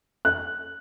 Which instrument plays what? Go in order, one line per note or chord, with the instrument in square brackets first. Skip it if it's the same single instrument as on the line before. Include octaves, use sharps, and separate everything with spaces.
[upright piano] F#6